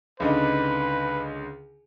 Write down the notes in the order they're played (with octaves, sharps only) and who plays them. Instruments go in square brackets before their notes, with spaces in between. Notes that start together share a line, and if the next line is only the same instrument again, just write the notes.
[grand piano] C#2 D3 D#4 [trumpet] B4